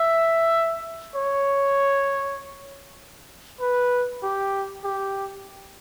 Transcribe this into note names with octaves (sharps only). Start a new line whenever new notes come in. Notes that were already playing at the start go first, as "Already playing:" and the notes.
Already playing: E5
C#5
B4
G4
G4